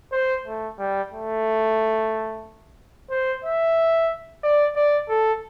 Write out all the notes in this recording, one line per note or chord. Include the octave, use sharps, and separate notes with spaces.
C5
A3
G3
A3
C5
E5
D5
D5
A4